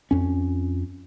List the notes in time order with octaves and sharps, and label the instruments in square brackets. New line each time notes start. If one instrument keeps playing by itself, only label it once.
[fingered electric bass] F2 C#4